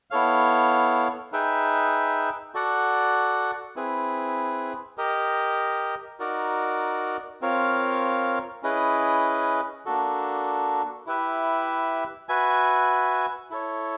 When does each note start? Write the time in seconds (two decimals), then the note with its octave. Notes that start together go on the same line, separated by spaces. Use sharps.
0.11 B3 E4 A4 C#5 F5
1.32 D#4 G#4 B4 E5 G5
2.54 F#4 A4 D5 F#5
3.76 C4 E4 G#4 B4
4.98 G4 A#4 D#5
6.20 D#4 F#4 A#4 D5
7.41 C4 F4 A#4 C#5 F5
8.63 C#4 E4 G#4 B4 D#5
9.85 A#3 D4 F#4 A4
11.07 E4 G4 B4 E5
12.29 F#4 B4 E5 G#5
13.50 E4 A4 C#5